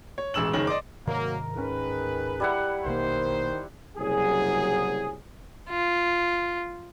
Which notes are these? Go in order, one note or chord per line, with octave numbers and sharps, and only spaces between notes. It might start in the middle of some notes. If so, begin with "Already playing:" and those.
C#5
E1 A1 G#3 E6 E7 F#7
F#1 D#3 G#4 C#5 F#7
D5 D#5 C6 D6
G#2 C3 D#3 F#3 A#3 A#4
D1 G#2 D#3 C#4 G#4 B4
G3 E4 F#5
A#1 B2 D#3 A#3 C5
F#1 C2 F#3 G#4
F4